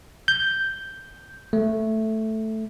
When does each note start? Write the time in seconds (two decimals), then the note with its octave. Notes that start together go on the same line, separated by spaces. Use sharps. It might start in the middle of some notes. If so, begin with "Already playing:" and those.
0.28 G6
1.53 A3